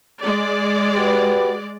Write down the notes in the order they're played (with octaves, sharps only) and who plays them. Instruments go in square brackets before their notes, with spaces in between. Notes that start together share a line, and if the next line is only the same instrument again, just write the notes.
[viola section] G#3 D5
[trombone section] F#4 G4 B4